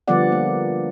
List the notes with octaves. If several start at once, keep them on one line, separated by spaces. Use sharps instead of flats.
D3 F3 G3 B3 D5 F#5
A#3